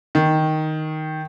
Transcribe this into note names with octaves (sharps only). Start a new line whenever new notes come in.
D#3